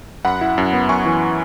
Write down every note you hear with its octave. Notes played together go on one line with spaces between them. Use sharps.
F#2 F#5 B5
E4
F#2
B3
F#2 G#5 C#6
E3